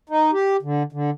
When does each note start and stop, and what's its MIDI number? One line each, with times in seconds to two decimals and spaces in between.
0.09 0.31 63
0.32 0.57 67
0.62 0.83 50
0.92 1.10 50